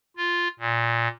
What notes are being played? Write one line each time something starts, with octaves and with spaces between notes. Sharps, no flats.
F4
A#2